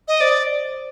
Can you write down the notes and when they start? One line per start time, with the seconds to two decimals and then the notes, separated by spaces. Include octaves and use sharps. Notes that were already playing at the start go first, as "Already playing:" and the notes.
0.08 D#5
0.20 C5 D5